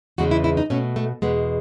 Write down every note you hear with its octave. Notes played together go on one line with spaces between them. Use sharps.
E2 C#3 E3 G#3 F#4
E4
E4
D#4
B2 A3 C#4
A3
E2 B2 G#3 B3